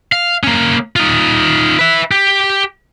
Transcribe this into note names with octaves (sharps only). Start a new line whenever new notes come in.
F5
A#3 C#4
D#4 F4
B4 E5
G4